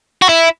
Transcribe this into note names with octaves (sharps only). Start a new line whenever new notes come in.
F#4
E4